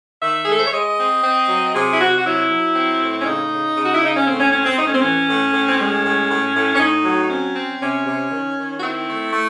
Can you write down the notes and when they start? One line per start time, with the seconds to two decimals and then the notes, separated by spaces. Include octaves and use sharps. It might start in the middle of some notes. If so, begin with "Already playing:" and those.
0.22 D#3 E5
0.45 G#4
0.48 G#3 A4
0.59 C5
0.66 C#5
0.73 G#3 D#5
0.98 C4
1.24 C4
1.49 F#3
1.75 C3 G#4
1.92 E4
2.00 C3 F#4
2.17 F#4
2.25 F#3 E4
2.50 F#3
2.75 C4
3.01 A2
3.21 C#4
3.26 C#3 D#4
3.51 C#3
3.77 C#3
3.83 F#4
3.94 E4
4.02 C#3 D#4
4.16 C#4
4.27 A2 C4
4.40 C#4
4.52 C4 C#4
4.65 C4
4.77 A2 D#4
4.86 C#4
4.94 C4
5.02 E3 C#4
5.28 A2
5.53 A2
5.68 C4
5.79 G#3 C#4
6.04 A2
6.29 A2
6.55 A2
6.75 C#4
6.80 A2 D#4
7.05 F#3
7.30 C4 C#4
7.56 C4
7.81 C3 C#4
8.06 C3
8.32 D#3
8.57 D#3
8.78 F#4
8.82 C4 E4
9.07 A3
9.33 A3